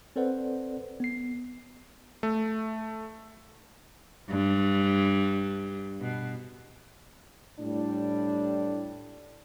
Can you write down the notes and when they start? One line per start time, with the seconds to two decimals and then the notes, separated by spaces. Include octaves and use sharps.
0.16 C4 A4 B4 C5 D5 F#5
1.00 B3 C7
2.23 A3
4.30 G2
6.00 B2
7.60 A2 G3 D4